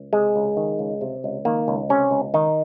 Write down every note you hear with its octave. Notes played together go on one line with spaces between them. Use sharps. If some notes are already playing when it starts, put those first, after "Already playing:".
Already playing: C#2
C3 G#3
C#2
D#3
C#2
C3
C#2
D#3 A#3
C#2
C3 C#4
C#2
D#3 D#4